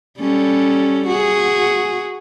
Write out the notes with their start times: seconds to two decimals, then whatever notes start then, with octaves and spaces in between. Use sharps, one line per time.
0.19 G3 C#4 A4
1.07 F#4 G#4